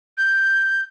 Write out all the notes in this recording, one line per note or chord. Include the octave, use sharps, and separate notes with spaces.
G6